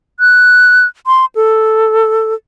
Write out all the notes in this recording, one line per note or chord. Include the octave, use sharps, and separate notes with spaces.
F#6
C6
A4